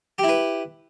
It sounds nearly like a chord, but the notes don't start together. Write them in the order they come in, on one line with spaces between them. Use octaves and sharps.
G4 E4 B4